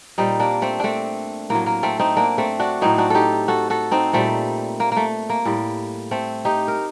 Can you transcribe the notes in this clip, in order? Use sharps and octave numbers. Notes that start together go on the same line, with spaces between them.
A#2 G3 C4 D#4
A#3 D4
A3 C4
A3 C4 D4
A2 F#3 A#3
A#3
A3 C4
C4 D#4
A#3 D4
A3 C4
D4 F#4
A2 F#3 C4 D#4
D4 F#4
D#4 G4 A4
F#4 A4
F#4 A4
C4 D#4
A#2 G3 A3 C4
A#3
A3 A#3
A#3
A2 G3
A3 C4
D#4 G4
A#4